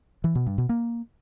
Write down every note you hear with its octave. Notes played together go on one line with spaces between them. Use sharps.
E3
B2
G2
B2
A#3